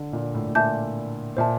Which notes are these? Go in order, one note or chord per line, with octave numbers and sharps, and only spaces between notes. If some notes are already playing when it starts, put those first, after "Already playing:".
Already playing: D3
A#2
A2
A2
A#2 E5 A5 D6 G6
A#2 C5 E5 A5